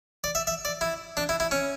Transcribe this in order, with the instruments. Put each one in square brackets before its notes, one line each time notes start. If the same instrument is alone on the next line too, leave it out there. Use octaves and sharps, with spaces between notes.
[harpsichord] D5
E5
E5
D5
E4
D4
E4
E4
C#4